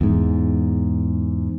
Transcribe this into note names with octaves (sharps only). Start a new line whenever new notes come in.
E2 G#2